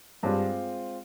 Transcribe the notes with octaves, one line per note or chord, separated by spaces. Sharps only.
G2 G#3 C4 F4